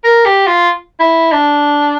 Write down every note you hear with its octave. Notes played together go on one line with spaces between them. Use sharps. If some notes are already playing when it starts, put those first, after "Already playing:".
A#4
G4
F4
E4
D4